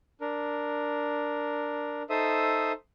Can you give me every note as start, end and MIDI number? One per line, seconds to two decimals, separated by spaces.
0.21 2.03 62
0.21 2.03 70
2.10 2.72 63
2.10 2.72 69
2.10 2.72 72
2.10 2.72 76
2.10 2.72 87